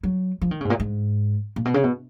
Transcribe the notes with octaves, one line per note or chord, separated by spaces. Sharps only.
F#3
F3
D#3
C#3
G#2
A#2
G#2
A#2
B2
C#3
B2